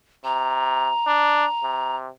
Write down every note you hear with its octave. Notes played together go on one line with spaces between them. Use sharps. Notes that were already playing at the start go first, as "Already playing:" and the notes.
C3 A#5
D4
C3